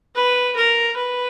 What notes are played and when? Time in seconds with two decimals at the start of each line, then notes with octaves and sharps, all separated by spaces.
0.15 B4
0.56 A#4
0.96 B4